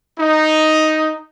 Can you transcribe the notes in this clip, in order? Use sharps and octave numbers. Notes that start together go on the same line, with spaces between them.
D#4